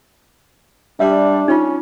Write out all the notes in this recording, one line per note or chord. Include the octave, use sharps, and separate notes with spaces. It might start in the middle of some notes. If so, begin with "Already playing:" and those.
G3 D4 E5
C#4 D#4 F4